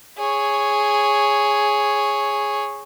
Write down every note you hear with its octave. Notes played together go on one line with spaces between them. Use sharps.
G#4 C#5